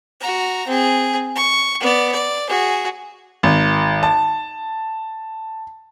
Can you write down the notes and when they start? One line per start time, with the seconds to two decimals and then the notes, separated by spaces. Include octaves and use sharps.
0.20 F#4 A#5
0.67 C4 G#4
1.36 C#6
1.81 B3 D5
2.12 D5
2.49 F#4 G#4
3.43 G#1
4.03 A5